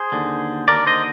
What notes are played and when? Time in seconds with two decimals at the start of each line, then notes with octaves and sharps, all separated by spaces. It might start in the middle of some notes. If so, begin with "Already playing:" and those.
Already playing: G#4 C5
0.12 D#2 D3
0.68 D#2 D3 A#4 D5
0.86 C5 D#5